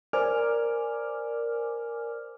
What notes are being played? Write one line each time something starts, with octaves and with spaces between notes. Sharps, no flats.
A#4 C5 D5 G#5 D6 F6